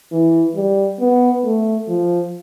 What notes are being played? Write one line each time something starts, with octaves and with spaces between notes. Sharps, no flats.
E3
G3
B3
A3
F3